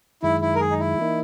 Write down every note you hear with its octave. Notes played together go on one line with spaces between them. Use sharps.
F#2 D#3 G#3 E4
E4
A#4
G#4
D#4
E4
E3 A#3 D#4